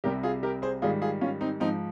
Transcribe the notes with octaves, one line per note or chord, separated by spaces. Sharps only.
C2 C3 G3 G4 A#4
F4 G#4
G4 A#4
G#4 C5
G#2 D#3 G3 F4 G#4
F4 G#4
C#4 F4
C4 D#4
G#2 F3 C4 D#4